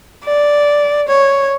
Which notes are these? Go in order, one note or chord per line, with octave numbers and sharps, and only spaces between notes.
D5
C#5